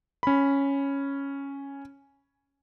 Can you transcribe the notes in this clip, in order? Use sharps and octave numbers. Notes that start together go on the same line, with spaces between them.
C#4 B5